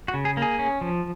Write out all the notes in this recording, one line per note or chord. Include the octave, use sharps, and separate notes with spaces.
F#4
C#3
G#4
A#3 G#4
C#4
F3